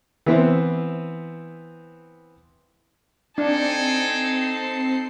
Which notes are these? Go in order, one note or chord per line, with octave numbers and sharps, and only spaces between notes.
E3 B3 C4
C4 D4 D#4 A4 G5 G#5 C7